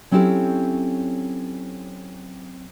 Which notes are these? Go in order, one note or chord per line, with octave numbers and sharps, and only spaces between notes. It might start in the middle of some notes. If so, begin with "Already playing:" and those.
F#3 C4 C#4 E4 G4 A4